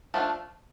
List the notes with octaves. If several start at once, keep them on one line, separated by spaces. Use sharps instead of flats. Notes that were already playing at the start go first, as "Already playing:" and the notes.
F3 A3 D4 F4